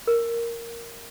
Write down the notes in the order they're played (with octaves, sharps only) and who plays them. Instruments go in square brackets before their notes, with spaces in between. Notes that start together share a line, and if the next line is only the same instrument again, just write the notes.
[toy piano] A#4